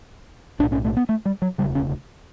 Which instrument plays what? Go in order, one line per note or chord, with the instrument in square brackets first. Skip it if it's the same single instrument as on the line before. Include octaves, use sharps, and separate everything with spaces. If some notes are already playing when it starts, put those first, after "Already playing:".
[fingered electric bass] B1 A2 D4
C#4
A3
B3
A3
G3
F#3
E1 D2 C#3 G3
C#4